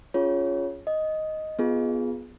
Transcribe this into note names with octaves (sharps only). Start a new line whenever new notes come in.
C#4 F4 G#4 C#5
D#5
B3 F4 G#4